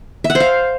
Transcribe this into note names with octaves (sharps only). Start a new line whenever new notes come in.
E5
F#5
C5
F5